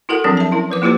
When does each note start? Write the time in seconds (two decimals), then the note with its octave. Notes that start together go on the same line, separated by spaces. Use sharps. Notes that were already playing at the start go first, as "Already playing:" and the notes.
0.09 E4 F#4 A4 A#4 F#5
0.24 F3 F#3 C4 D4 G#4 A#4
0.37 E5 A5
0.52 C#4 E4 A#4
0.70 F3 B4 D6
0.82 A#3 E4 F4 G4 B4 C5